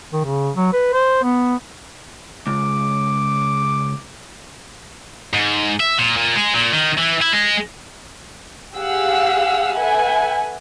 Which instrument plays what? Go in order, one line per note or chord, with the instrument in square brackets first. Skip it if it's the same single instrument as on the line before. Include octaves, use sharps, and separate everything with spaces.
[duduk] D#3
C#3
F#3
B4
C5
B3
[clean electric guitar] C#2 [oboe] D6
[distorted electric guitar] G#2
E5
A#2
A#2
G#3
A#2
D#3
E3
E4
G#3
[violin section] G4 G#4 F5 F#5 E6
A4 B4 E5 F#5 G#5